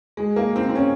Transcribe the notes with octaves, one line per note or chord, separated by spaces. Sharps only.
G#3
A#3
C4
C4
C#4